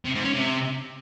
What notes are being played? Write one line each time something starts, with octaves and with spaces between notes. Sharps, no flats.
C3
G#2
C#4
C3